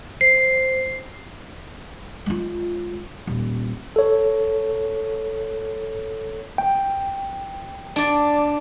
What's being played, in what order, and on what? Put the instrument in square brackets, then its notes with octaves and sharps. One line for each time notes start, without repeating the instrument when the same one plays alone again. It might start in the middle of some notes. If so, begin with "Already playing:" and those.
[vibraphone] C5 [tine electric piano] C7
[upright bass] G#3 F4
D#1
[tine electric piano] A4 C#5
[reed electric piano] G5
[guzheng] D4 D5